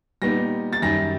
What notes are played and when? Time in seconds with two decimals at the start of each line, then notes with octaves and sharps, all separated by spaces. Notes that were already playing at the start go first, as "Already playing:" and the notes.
0.22 A#2 G3 B3 D#4 A#6
0.73 A6
0.82 F#2 D#3 G3 A#6